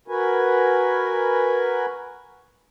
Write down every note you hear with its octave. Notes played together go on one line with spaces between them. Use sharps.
F#4 A#4 B4 G#5